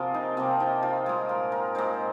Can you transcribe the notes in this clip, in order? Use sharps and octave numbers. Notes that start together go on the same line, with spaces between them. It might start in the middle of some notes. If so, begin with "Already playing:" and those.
Already playing: C3 F3 A#3 F4 G#4 A#4
D#4
C3 F3 A#3 C4
D#4
F4
A#2 G#3 G#4
A#4
A#4
A#2 G#3 C5